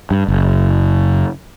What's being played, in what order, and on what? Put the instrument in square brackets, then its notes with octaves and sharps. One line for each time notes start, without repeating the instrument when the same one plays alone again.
[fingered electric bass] G2
F#1